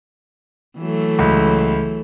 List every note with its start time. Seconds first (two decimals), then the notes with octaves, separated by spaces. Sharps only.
0.78 E3 F#3 A3
1.19 C#2